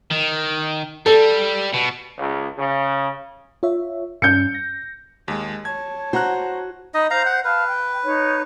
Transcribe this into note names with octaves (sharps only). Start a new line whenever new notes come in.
D#3
G3 A4
B2
C#2
C#3
F4 C#5 E5
G2 C#4 G6 C#7
A#6
D#2 G#3
C#5 A5 G#6
F#4 C5 A#5 F#6
D#4 D#5 B5
C5 F5 A#5 G6
F#5
B4 F5 A5 F6
G5
D#4 C#5